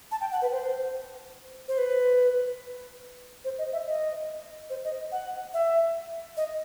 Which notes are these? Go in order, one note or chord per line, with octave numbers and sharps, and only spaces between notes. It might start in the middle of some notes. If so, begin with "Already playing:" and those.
A5
G5
F#5
B4
C5
C5
B4
C5
D#5
E5
D#5
C5
D#5
F#5
E5
D#5